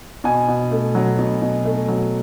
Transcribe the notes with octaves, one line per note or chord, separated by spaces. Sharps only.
B2 G#5
B2
A3
F#3
B2
B2
A3
F#3